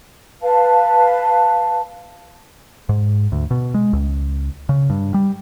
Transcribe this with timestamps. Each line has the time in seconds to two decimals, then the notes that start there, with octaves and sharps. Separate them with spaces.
0.42 B4 F5 A5
2.89 G#2
3.32 D2
3.51 B2
3.74 G#3
3.93 C#2
4.69 C#3
4.90 G2
5.14 G3